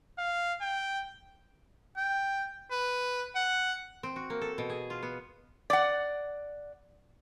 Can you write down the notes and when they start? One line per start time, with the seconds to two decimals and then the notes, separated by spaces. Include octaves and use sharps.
0.19 F5
0.62 G5
1.97 G5
2.71 B4
3.35 F#5
4.03 C4
4.16 F#4
4.30 A#3
4.41 A4
4.58 B2
4.70 G#4
4.90 F4
5.03 B3
5.70 D5 F#5